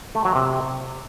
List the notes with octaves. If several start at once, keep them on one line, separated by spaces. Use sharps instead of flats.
A3
F#3
C3